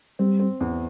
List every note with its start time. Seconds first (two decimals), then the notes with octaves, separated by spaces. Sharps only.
0.19 G3 C4
0.40 C4
0.60 E2